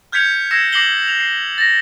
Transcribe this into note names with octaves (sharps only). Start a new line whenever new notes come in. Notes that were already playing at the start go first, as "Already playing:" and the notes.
F6 G6 G#6 B6 C#7 F7
E6 G#6 A#6 C7 C#7 E7
D6 A#6 C7 E7 F#7 G7
F7
C7
A6 A#6